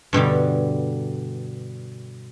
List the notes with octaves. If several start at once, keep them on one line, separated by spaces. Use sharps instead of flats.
G2 B2 D3 G3